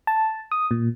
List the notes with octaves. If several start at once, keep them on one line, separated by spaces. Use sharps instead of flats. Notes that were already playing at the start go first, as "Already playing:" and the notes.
A5
D#6
A#2